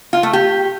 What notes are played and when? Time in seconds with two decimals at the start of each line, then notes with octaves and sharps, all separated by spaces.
0.13 F4
0.23 A3
0.33 G4